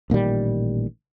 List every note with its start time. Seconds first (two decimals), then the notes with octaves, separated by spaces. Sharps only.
0.10 A1 A#2 D#3 G3